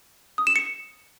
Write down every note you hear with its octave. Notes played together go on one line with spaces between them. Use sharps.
D#6
E7
C#7